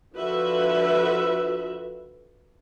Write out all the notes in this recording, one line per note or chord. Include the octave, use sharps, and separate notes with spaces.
D3 F3 F#4 B4 E5